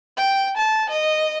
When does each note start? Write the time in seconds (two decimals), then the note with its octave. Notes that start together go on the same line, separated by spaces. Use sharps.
0.17 G5
0.57 A5
0.89 D#5